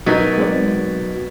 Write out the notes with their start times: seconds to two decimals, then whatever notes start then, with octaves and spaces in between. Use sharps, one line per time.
0.06 B2 F#3 D#4 A#4 G#6 A6 B6
0.38 G#3 C4 D5